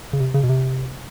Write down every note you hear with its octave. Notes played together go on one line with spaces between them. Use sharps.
C#3
C3
C#3
B2
C3